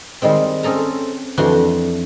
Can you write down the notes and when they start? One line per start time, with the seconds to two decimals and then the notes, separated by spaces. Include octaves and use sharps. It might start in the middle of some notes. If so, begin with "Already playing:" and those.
0.22 D#3 G3 G#3 C4
0.63 C4 C#4 G#4 A4 A#5
1.38 F2 E3 D4 F#4 C6